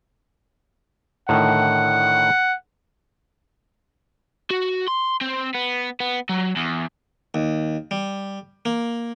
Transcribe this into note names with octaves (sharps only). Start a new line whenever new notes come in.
A2 D3 D#3 F#5
F#4
C6
C4
B3
B3
F#3
E2
D#2
G3
A#3